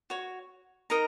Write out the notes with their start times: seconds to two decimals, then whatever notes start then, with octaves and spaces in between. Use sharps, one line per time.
0.10 F#4 C#5
0.90 D#4 A#4 D#5 A#5